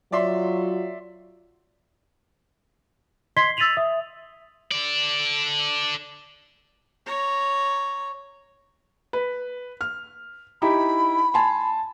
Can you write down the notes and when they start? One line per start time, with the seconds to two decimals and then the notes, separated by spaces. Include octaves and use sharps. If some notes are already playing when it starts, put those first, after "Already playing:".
0.12 F#3 F4 D5 E5 C6
3.37 D#5 C6 G#6 B6 C7 G7
3.57 E6 A6 B6 D#7 F7 F#7
3.77 E5 D#6
4.72 A4 D5
7.06 C#5 A#5
9.13 B4
9.81 F6
10.62 D#4 E4 G4 B5
11.34 G#5 A5 C6